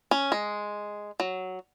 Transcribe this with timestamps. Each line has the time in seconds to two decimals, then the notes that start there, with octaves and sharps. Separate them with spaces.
0.11 C#4
0.32 G#3
1.20 F#3